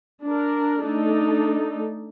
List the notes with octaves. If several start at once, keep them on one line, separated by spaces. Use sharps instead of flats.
D4 A#4
A3 D4 D#4 A4